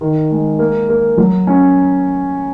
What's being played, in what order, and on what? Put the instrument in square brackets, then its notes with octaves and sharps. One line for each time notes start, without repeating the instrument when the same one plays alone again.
[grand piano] D#3
G#3
A#3
A#3
F#3
C#4